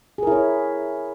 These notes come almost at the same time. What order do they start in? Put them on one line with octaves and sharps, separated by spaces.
G#4 A#4 E4 C#5